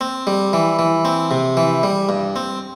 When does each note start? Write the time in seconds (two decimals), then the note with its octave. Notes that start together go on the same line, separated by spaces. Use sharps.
0.01 C4
0.27 G3
0.53 E3
0.79 E3
1.05 C4
1.31 C3
1.57 E3
1.83 G3
2.09 G2
2.36 C4